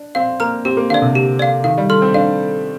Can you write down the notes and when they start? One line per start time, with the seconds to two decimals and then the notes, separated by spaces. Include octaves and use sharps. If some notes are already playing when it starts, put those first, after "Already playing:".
Already playing: D4
0.15 C4 F5
0.40 A#3 A#5 F6
0.65 C4 G4
0.77 A#3
0.90 D3 F5
0.94 D5
1.02 C3
1.15 G4
1.39 D5 F5
1.64 D#3 F5
1.78 G3
1.89 A3 C6 F6
2.02 C4
2.14 D4 F5